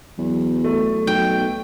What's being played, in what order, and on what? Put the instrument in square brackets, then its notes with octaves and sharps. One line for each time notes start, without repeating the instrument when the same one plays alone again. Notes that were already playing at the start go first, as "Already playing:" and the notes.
[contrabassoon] E2 [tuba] F#3
[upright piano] A3
[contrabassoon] B1 [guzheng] G5